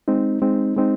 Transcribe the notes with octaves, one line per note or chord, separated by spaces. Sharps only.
G#3 C4 D#4
G#3 C4 D#4
G#3 C4 D#4